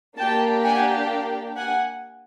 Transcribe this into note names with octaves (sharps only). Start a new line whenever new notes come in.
A#3 D4 G4 G5 A5
F#5 G#5
F#5 G#5